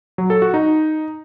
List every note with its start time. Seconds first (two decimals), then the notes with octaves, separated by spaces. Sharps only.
0.18 F#3
0.30 A4
0.42 F#4
0.54 D#4